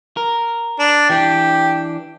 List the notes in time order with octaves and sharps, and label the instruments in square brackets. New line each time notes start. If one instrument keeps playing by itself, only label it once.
[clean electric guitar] A#4
[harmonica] D4
[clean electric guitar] E3 D4 [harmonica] G4